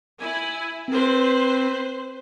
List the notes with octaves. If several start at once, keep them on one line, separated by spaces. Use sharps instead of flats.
E4 G#5
C4 B4 C5